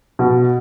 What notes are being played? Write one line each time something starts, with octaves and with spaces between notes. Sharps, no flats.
B2